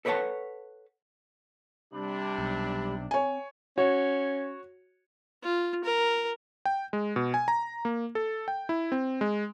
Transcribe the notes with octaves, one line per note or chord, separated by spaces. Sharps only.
A4 B4 C#5 D5 F#5 A5
C3 G3 D4 G4 B5
B1
C4 C#5 G#5
C#4 F#4 C#5
F4
A#4
G5
G#3
B2
G#5
A#5
A#3
A4
G5
E4
C4
G#3